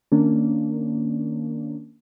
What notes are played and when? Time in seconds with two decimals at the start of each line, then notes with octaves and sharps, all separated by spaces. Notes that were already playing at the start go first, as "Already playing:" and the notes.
0.12 D#3 A#3 C#4 D4